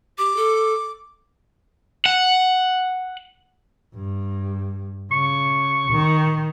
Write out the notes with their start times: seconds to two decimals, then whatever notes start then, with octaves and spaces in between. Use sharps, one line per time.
0.18 G4 D6
0.36 A4
2.06 F#5
3.95 G2
5.11 C#3 C#6
5.91 D#3